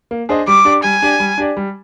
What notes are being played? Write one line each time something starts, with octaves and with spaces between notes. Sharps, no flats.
A#3
D4 G#4 C5 D#5
G3 D6
D4 G4 D5
G3 G#5
D4 G4 D5
G3
D4 G4 D5
G3